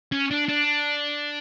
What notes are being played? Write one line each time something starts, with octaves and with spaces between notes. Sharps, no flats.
C#4
D4
D4